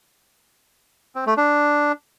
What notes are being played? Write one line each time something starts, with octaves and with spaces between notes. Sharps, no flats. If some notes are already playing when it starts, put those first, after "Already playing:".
C4
A3
D4